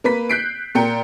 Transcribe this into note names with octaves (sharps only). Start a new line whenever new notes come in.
A#3 B4 B6
F#6 G6 B6 C7 D7
A#2 A#4 G5 C#7